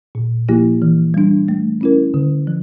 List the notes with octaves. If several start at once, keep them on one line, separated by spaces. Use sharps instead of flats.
A#2
F3 A#3 E4 G4
E3
G3 D4
A3
C#4 E4 A#4
D3
F3